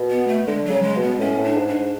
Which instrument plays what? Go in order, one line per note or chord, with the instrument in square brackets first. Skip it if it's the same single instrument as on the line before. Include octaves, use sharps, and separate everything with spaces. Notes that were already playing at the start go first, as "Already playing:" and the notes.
Already playing: [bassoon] B2
[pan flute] B3
A3
[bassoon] D3 [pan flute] G#3
[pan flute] F#3
[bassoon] C#3
[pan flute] G#3
[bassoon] B2
[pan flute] B3
[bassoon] A2 [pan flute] C#4
[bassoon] A2
[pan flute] D4
[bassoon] G#2
[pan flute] D4
[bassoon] G#2